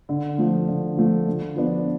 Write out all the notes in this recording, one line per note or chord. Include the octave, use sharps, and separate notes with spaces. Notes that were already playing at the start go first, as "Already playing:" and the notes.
D3
F3 A3
D3
F3 A3
D3
F3 B3 D4